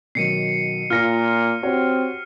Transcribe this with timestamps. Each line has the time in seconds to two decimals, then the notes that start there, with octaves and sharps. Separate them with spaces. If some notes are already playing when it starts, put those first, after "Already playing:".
0.15 B2 D#3 F#3 C7 C#7 D#7
0.90 A#2 F4 F6 A#6 C#7
1.63 C4 F#4 G4 C#5